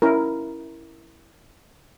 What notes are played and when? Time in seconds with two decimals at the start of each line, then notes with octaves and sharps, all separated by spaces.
0.02 C#4 E4 A#4